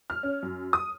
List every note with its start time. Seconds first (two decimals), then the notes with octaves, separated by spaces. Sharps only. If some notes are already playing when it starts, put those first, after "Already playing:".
0.10 F6
0.23 C#4
0.43 F#2
0.73 D#6